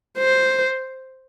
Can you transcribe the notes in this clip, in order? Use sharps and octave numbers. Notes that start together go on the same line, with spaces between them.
C5